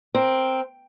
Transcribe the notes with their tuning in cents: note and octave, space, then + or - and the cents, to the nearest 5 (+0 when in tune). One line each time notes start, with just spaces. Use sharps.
C4 +0 A#4 +0